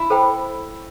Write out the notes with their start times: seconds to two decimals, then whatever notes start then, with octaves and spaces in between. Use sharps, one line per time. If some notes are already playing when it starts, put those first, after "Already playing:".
Already playing: E4
0.10 A4 C5 G5 B5